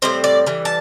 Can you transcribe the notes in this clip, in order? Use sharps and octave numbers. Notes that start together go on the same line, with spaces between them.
A2 G3 C4 C5
D5
E3 G3
A5